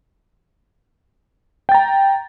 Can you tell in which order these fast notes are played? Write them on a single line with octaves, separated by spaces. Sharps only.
G5 A6 A#5